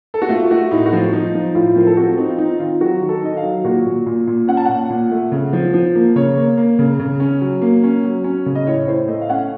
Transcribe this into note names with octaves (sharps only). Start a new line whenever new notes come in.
A4
F#4
A3 F4
A3 F#4
A2 D#4
F#4
F3 F4
F3 D#4
F3
A2 F4
F3 A#4
A4
C4 F#4
C4 D#4
F4
C4 D#4
D#3 F4
F#3 F#4
D#3
A4
D#3 D#5
F5
F#3
A#2 F#4
A#2
A#2
A#2
C#4 F#5
A5
A#2 F#5
A#2
A3
C#3
F3
F3
A#3
C#3 C#5
A#3
A#3
C#3
C#3
C#4
F#3
A#3
C#4
F#3
C#4
C#3
D#5
A2 C#5
A2 C5
A3 D#5
F5
C#4 F#5